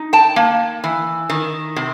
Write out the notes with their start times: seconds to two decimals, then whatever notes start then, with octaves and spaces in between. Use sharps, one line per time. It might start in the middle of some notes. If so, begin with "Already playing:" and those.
Already playing: D#4
0.13 G5 A5
0.36 A#3
0.84 E3
1.30 D#3
1.76 C3